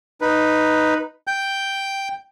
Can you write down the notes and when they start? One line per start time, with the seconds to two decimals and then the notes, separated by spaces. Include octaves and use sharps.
0.21 D#4 B4
1.27 G5 G6